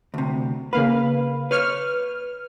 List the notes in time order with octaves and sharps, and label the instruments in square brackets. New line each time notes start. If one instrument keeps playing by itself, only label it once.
[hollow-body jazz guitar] D2 C3
[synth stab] C#3 A#3 F5 [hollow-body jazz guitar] B4
[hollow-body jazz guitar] B4 C#5 [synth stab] F6